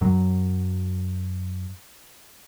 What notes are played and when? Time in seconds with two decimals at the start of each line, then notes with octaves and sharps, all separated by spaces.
0.01 F#2 F#3